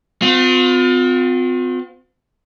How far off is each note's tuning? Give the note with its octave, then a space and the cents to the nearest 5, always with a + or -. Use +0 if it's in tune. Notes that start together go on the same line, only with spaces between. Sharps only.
C4 -35 F4 +35